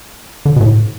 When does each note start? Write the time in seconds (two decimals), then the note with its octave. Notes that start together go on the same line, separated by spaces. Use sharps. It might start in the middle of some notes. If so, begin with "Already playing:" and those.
0.45 D3
0.56 B2
0.61 A2